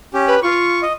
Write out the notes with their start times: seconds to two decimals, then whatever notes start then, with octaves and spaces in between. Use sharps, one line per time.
0.14 C#4 G4
0.27 B4
0.43 F4 C#6
0.82 D#5